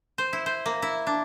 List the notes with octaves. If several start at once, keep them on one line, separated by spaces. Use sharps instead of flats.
C5
E4
C5
A#3
E4
D4